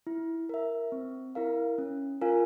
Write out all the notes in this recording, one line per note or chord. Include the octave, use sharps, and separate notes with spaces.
E4
A#4 E5
C4
E4 A#4 F5
C#4
F4 A#4 F5 G#5